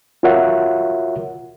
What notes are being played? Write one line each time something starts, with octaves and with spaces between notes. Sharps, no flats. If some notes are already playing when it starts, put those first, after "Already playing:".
F4 F#4 A#4 C#5 E5 F#5